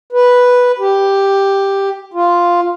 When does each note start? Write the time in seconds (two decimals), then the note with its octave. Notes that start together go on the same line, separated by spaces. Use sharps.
0.13 B4
0.79 G4
2.14 F4